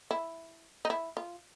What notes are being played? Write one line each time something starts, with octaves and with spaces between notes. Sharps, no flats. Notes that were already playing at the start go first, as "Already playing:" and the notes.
E4
D#4
E4
F4